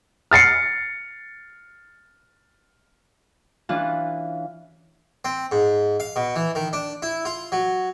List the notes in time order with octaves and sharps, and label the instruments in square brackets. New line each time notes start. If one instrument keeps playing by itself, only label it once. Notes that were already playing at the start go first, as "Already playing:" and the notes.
[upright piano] F6 A6 C7 C#7
[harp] E3 C#4 D4 F4
[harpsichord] C4
G#2
F5
B2
E3
D#3
D4
E4
F4
F#3